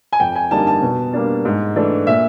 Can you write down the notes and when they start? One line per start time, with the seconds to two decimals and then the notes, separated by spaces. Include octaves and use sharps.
0.13 G#5
0.20 F2 G5
0.36 G#5
0.51 D3 G3 A#3 D#4 A5
0.67 A5
0.82 B2
1.13 G3 A#3 D4
1.45 G#2
1.75 E3 A3 D4
2.07 A#2 E5